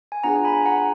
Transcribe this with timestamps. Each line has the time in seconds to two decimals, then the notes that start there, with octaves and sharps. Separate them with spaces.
0.12 G#5
0.23 B3 D4 F4 G#4 F#5 A#5
0.45 G#5 B5
0.55 G#5
0.66 F#5 A#5